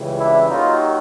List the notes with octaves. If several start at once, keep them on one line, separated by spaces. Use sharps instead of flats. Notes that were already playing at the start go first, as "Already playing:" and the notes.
Already playing: C#2 C#3 E3 G3
D4 E4
D#2 D#3 F#3 D#4 F4